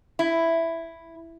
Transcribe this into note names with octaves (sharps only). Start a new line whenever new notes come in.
E4